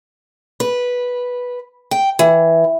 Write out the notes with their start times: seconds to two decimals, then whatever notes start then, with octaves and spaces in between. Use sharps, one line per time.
0.60 B4
1.91 G5
2.19 E3